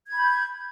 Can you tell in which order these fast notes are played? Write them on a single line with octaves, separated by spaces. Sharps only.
G#6 B5 G6